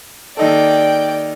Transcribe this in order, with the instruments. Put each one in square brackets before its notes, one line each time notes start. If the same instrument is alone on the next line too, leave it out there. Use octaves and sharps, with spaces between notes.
[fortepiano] D#2 D#4 A4 [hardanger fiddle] D5 G5